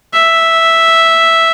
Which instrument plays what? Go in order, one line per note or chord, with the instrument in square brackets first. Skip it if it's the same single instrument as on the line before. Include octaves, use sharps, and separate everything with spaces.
[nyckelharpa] E5